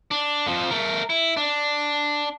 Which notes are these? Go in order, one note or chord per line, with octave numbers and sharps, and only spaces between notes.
D4
F2 F3
A3 A#4
E4
D4